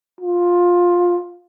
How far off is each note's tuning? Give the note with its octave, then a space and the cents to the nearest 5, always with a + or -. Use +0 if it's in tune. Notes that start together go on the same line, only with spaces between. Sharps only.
F4 +10